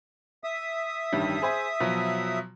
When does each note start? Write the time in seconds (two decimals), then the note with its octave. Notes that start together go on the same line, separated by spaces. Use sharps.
0.44 E5 D#6
1.13 A1 G2 D#3
1.42 G#4 C5 G#5
1.80 B2 F3 F#3